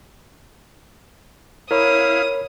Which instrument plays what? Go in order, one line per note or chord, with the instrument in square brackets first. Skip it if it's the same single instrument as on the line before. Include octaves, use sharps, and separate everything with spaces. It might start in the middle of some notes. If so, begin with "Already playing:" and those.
[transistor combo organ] E4 F5 [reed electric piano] A#4 C#5 B5 [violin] D#6